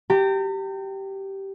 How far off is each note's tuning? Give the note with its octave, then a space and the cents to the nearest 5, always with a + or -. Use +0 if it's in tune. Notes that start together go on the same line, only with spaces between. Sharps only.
G4 -10 A#5 -45